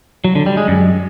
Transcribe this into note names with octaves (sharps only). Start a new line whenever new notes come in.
F#3
D3
G3
G#3
F#2